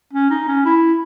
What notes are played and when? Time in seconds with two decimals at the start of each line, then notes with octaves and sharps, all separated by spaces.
0.13 C#4
0.30 D#4
0.48 C#4
0.65 E4